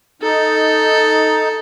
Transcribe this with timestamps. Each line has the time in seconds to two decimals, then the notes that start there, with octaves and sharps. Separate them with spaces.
0.22 D#4 A4